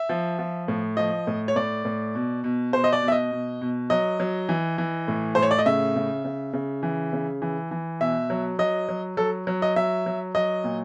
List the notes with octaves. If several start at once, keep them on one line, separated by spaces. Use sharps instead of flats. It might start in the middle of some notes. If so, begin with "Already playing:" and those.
Already playing: E5
F3
F3
A2
F3 D#5
A2
C#5
A2 D5
A2
B2
B2
B2 C5
D#5
D5
B2
E5
D#5
B2
B2
F#3 D#5
F#3
E3
E3
A2
A2 C5
C#5
D5
D#5
C#3 E5
C#3
C#3
C#3
E3
C#3
E3
E3
B2 E5
F#3
F#3 D#5
F#3
F#3 A4
F#3
D#5
F#3 E5
F#3
F#3 D#5
A#2